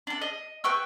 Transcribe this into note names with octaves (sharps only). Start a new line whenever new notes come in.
D4 A4
D#5
B4 G5 C#6 E6